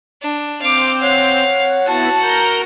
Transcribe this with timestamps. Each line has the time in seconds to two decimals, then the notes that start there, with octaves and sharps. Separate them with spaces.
0.22 D4
0.62 C4 C5 F5 D6
1.02 C#5 F5 F#5
1.87 B3 E4 F#4 A5
2.22 A#4 A#5 G6